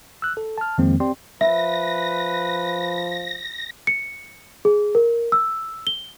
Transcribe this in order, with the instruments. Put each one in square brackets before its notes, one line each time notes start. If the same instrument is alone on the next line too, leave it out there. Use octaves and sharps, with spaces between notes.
[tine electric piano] E6 F#6
A4
A5 F6
F2 D#3 F3 G#3 A#3 C4
C4 G4 D5 G5 C6
[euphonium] F3 [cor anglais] B4 [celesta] E5 [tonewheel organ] A#6
[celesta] C#7
G#4
A#4
E6
G7